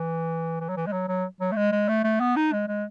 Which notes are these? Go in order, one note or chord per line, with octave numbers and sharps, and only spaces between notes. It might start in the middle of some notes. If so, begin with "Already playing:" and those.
Already playing: E3
E3
F#3
E3
G#3
F#3
F#3
F#3
A3
G#3
G#3
A3
A3
B3
D#4
G#3
G#3